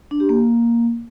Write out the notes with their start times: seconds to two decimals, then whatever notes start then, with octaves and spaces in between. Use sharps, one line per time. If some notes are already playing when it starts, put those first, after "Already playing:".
0.11 D4
0.20 G4
0.29 A#3